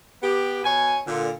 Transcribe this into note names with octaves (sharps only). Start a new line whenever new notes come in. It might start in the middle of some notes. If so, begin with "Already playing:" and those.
B3 G4
B2 C#5 G#5
A#2 D3